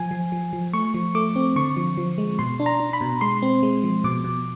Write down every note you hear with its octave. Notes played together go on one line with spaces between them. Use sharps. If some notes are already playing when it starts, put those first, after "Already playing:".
Already playing: F3 G#5
F3
F3
F3
A3 C#6
F3
A3 D6
C4
D3 C#6
F3
F3
G#3
B2 C6
D4
A#5
D4
B5
B2
G#3 C6
C4
G#3
F3
B2 D6
B2